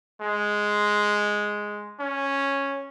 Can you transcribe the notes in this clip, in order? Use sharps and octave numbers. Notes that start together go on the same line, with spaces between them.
G#3
C#4